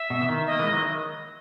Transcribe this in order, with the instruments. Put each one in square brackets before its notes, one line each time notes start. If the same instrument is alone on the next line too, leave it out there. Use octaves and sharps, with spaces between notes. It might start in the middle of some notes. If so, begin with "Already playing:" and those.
Already playing: [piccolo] E5
[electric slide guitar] B2
E3
D#3
[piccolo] D#5
[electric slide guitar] A#3
E3 G#3
D#3 F#3